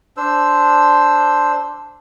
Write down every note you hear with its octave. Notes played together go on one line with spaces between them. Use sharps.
D4 C5 E6